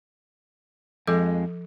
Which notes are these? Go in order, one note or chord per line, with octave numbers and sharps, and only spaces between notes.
F2 F3 G#3 A4 D6